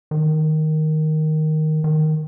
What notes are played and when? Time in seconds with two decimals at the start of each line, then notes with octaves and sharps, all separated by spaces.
0.11 D#3
1.84 D#3